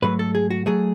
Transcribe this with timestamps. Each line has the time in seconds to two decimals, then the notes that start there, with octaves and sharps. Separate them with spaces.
0.02 G#2 F#3 A3 B4
0.19 A4
0.35 G#4
0.50 F#4
0.66 F#3 A3 G#4